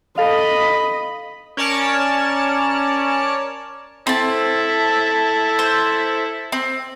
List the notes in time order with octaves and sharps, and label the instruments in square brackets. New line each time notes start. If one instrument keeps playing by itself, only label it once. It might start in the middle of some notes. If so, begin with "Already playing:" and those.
[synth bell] A4 F5 [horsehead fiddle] D#5 [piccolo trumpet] B5
[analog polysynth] C#4 A#4 C#5 D5 A5
[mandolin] C4 A5 [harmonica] E4 A4
[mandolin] C5
C4